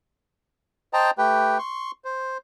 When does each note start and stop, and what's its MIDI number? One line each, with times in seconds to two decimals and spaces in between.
0.93 1.11 72
0.93 1.11 75
0.93 1.11 79
0.93 1.11 81
0.93 1.11 82
1.18 1.58 57
1.18 1.58 67
1.18 1.58 71
1.18 1.58 79
1.58 1.91 84
1.58 1.91 85
2.05 2.38 72